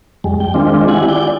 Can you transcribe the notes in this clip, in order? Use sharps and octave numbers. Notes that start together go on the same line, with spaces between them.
F2 G3 G#3
G5
D#3 G#3 C4 D4 F4
E4 G4 F#5 G#5
D5 G6